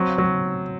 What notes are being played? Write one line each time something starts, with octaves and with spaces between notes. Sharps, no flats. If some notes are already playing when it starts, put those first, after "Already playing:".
Already playing: F#3 C4
F#3